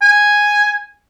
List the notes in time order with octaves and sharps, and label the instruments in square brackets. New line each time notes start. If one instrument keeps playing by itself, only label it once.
[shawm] G#5